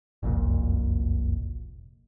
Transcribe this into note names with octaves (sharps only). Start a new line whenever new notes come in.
F#1 C2 F2 A#2